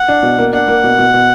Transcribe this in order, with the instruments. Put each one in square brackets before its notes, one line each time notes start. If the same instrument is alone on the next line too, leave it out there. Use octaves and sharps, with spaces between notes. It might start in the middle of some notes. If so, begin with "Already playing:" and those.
Already playing: [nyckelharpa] F#5
[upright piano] D4
B2
A#3
[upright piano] D4 [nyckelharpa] F#5
[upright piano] A#3
B2
B2
B2